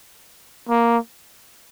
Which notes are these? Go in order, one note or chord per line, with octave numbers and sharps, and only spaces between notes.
A#3